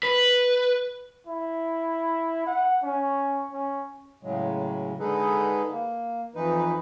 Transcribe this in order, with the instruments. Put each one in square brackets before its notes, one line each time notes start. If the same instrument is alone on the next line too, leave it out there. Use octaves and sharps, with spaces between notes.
[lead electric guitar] B4
[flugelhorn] E4
F#5
C#4
C#4
[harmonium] A2 C#3 F#3 G#3
D3 G#3 D#4 G#4 A4 B4
A#3
F2 E3 D#4 B4